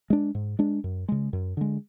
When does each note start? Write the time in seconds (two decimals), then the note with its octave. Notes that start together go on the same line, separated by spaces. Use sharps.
0.10 G#3 D4
0.35 G#2
0.59 G#3 D4
0.84 F#2
1.08 C#3 G#3
1.33 F#2
1.57 D3 G#3